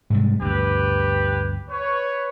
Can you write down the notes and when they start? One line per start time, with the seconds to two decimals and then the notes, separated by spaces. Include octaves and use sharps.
0.10 G#2 C3 G3
0.40 D2 G2 G4 B4
1.69 B4 C#5